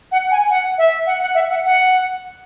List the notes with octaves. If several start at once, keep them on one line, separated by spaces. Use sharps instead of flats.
F#5
G#5
F#5
E5
F#5
F#5
E5
F#5
F#5